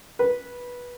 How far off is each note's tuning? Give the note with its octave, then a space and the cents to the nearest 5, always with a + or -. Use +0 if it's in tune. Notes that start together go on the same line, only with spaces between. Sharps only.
B4 -15